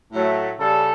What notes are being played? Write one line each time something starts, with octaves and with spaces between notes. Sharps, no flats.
A2 F#3 A3
C#3 G3 A4